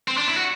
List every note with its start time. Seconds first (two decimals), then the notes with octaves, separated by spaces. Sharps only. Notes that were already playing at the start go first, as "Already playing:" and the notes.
0.08 C4
0.17 D4
0.28 E4
0.37 F#4